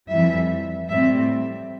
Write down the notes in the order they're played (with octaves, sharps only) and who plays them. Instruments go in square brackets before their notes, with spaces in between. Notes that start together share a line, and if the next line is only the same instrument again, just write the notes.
[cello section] F2 E3 G3 E5
A2 G3 C4 E5